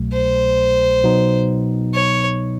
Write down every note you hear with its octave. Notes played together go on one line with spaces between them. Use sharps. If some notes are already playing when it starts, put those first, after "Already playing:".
Already playing: C2 B2 F#3 A3
C5
B2 F#3 B3 D#4
C#5